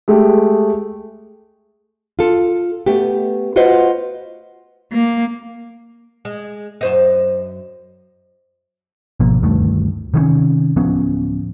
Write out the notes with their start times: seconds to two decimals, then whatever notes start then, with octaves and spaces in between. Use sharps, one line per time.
0.08 G#3 A3 G4
2.19 F4 A4
2.86 A3 B3 G4
3.56 F4 F#4 B4 C5 D#5 F#5
4.93 A#3
6.25 G#3
6.81 F#2 C5 D#5
9.20 G#1 B2 F3 A#3
9.43 D2 G2 D#3 A3
10.14 C3 D#3 F3 C#4
10.76 D1 F3 B3 C#4